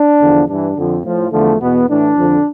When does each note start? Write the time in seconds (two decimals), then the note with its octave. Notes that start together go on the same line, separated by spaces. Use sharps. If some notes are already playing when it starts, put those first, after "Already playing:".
Already playing: D4
0.19 E2 D3 F3
0.48 G2 E3 D4
0.77 F2 D3 F3
1.04 A2 F3
1.32 E2 D3 F3 A3
1.61 E2 B2 B3
1.88 A2 E3 D4
2.17 F2 D3 F3